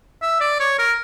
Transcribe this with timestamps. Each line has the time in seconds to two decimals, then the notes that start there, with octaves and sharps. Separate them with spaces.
0.22 E5
0.41 D5
0.60 C#5
0.79 A#4